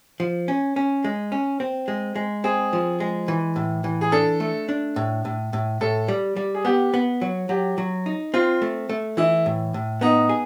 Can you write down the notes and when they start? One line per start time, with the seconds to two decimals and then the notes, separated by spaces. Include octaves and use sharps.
0.20 F3
0.48 C#4
0.76 C#4
1.04 G#3
1.32 C#4
1.60 C4
1.88 G#3
2.16 G#3
2.44 C4 G#4
2.73 F3
3.00 G#3
3.28 E3
3.56 A2
3.84 E3
4.01 G#4
4.12 D4 A4
4.40 A3
4.69 D4
4.96 A2
5.25 A2
5.53 A2
5.81 A2 A4
6.08 G3
6.36 G3
6.54 G#4
6.65 B3 G4
6.94 B3
7.21 F#3
7.49 F#3 G4
7.78 F#3
8.06 D#4
8.34 C4 F4
8.62 A3
8.89 A3
9.17 E3 E4
9.46 A2
9.74 A2
10.01 B3 D#4
10.29 G#4